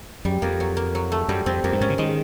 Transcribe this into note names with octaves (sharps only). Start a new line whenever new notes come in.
F#2 G3
F2 A#3
F#3
A#3
F#3
A3
F#2 G3
F2 C4
F2 A#3
G2
G#2 C#4
D3
D#3 G#3